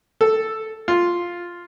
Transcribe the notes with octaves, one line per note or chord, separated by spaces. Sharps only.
A4
F4